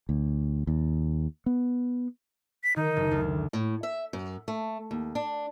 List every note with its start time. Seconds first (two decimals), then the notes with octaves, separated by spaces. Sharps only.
0.09 D2
0.67 D#2
1.46 B3
2.63 B6
2.76 D#3 D#4
2.96 F#1
3.11 D2
3.53 A2
3.83 E5
4.13 F#2
4.48 A3
4.91 D#2
5.15 D4